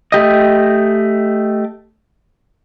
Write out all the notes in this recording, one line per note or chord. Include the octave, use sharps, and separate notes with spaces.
A3 G4 D#5